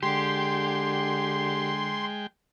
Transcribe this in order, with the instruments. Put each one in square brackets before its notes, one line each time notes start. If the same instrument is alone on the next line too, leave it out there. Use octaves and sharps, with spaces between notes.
[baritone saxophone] D3 [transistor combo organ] G#3 G5 [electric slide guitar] G4 [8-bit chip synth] C6